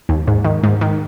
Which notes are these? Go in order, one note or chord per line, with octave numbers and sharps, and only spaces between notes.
D#2
G#2
D#3
G#2
D#3